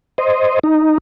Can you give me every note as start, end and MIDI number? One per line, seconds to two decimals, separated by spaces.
0.18 0.59 72
0.18 0.59 75
0.64 0.98 63